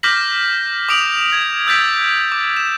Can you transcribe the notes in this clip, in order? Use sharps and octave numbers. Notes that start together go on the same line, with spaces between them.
D6 F6 G6 A#6 B6 F#7
D6 D#6 D7 F7 F#7
G#6
E6 G6 A6 B6 D7
D6
E7